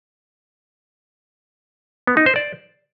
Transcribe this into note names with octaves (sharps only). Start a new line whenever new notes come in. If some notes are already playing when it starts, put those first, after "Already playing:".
B3
D#4
C5
D5